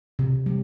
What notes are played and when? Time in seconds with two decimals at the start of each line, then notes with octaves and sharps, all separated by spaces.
0.19 C3
0.46 G3